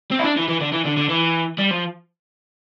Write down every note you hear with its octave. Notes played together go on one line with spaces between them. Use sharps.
C4
E4
D4
E3
E3
D3
E3
D3
D3
E3
G3
F3